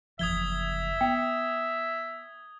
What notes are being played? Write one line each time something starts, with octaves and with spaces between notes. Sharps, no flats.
F#1 E2 F3 E5 D#6 G#6 G7
B3 G5